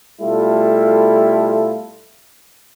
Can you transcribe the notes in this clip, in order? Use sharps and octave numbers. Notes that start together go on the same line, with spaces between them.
B2 G3 A3 E4 F4 A4